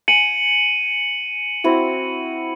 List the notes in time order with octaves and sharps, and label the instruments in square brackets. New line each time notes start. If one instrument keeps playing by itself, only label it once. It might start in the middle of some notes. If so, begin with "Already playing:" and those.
[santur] G#5 [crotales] C#7 D#7 F#7
[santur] C4 E4 F#4